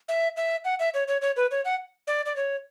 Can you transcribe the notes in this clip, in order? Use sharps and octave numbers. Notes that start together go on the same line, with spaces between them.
E5
E5
F#5
E5
C#5
C#5
C#5
B4
C#5
F#5
D5
D5
C#5